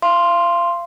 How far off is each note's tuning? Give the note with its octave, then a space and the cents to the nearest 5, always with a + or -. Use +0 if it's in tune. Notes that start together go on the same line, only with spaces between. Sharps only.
F5 -30 C6 +0